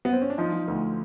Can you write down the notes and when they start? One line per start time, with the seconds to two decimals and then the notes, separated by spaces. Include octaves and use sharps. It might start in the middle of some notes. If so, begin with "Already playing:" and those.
0.05 B3
0.13 C4
0.22 C#4
0.30 D4
0.38 F3 D#4
0.53 F3
0.68 D2